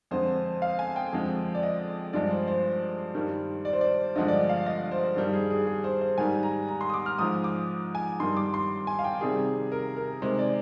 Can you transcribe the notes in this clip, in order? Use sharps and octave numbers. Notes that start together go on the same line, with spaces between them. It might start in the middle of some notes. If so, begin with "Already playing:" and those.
F2 D3 G#3 C5
F5
G#5
G5
F2 D3 F3 G#3
D5
D#5
G2 F3 G#3 D5
C5
C5
G2 D#3 G3
D5
C5
D5
G2 D3 F3 G#3 D#5
D5
D#5
F5
D#5
C5
G2 D#3 G3
G#4
G#4
G#4
C5
C5
G#2 D#3 G3 G#5
A#5
A#5
C6
D#6
D6
F6
G#2 F3 G#3 D#6
D6
G#5
G2 D#3 G3 C6
D6
C6
G#5
F5
G5
C3 D#3 G3 G#4
A#4
A#4
C3 D#3 G#3 C5
D5